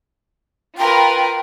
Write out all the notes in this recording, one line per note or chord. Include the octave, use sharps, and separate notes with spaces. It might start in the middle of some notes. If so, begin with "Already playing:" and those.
F4 A#4 B4 G5